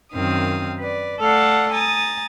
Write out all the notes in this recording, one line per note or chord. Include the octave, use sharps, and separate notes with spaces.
F#2 D#3 C4 F5 D#6
B4 D5
A3 A4 D5 F5 F#5 A5
G#5 A#5 D#6 A6